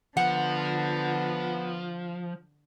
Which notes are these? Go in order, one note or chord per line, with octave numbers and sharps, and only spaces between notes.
D3 F3 B3 F#5